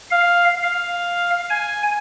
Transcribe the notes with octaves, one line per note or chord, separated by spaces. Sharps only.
F5
F5
G#5